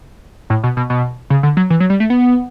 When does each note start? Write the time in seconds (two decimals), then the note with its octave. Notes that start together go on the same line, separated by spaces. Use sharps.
0.50 A2
0.63 B2
0.77 B2
0.90 B2
1.30 C#3
1.43 D3
1.57 F#3
1.70 E3
1.80 F#3
1.90 G3
2.00 A3
2.10 B3